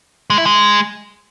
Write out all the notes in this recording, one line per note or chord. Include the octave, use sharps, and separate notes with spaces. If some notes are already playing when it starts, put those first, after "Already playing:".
G#3
E4
G#3